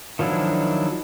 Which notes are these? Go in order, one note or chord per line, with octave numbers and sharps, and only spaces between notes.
D#3 F3 F#3 D4 E4